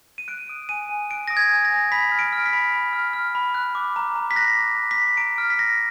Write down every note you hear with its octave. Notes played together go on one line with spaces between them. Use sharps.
D#7
F#6 D7
D#6
G#5 D#7
G#5
F#6 D7
D#6 A#6
G#6
G#5
A#6
G#5
B5 B6
F6
D7
F6
B6
B5
B5
F6
F6
B5
F#6
D6
A#5
A#5
B6
F#6 A#6
D6
A#5
B6
A#5
A#5 D7
F6
B6
F6 A#6